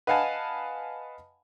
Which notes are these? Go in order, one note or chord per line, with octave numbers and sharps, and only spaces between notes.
B4 D#5 F5 F#5 G#5 A5